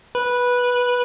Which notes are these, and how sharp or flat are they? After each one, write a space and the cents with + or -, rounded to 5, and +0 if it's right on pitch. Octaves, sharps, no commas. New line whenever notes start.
B4 -10